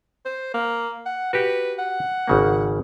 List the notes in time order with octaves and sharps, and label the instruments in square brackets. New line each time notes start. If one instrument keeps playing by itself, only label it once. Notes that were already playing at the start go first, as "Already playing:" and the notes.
[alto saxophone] C5
A#3
F#5
[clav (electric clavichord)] F#4 G4 [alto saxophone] B4
[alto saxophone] F#5
[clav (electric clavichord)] G#1 C#3 A#3